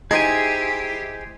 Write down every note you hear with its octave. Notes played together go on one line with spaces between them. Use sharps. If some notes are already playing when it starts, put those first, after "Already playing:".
D#4 E4 G4 G#4 C5 G#5